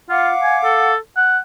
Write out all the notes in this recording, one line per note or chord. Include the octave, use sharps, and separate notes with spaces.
F4 F5 F#5 D6
G#5
A4
F#5